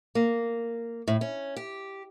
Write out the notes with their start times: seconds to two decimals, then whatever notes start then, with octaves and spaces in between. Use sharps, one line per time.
0.15 A#3
1.08 A2
1.21 C#4
1.57 G4